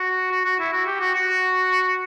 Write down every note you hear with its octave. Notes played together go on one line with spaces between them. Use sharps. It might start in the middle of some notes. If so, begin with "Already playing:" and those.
Already playing: F#4
F#4
F#4
E4
F#4
G4
F#4
F#4